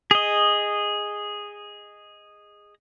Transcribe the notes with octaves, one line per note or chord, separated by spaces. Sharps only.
G#4 D#5